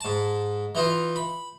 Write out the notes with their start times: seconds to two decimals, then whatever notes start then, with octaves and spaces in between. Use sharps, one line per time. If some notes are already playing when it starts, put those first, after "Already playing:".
0.01 G#2 A5
0.75 E3 D#4 F4
1.16 B5